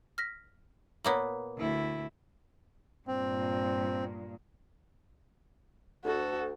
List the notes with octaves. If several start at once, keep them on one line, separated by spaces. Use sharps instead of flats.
F6 A#6 B6
A#2 A#3 B3 C#5 F#7
D2 E4
G2 A#2 C4
D2 F#4 A4